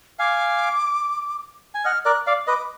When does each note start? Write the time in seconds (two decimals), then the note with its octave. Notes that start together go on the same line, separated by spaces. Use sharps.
0.19 F5 G#5 D6
1.75 G#5
1.85 D#5 F#5 F6
2.05 A#4 D5 F#6
2.27 D5 F5
2.47 B4 D#5 D6